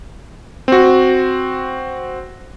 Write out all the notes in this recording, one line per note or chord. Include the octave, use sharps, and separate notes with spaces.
C4 F#4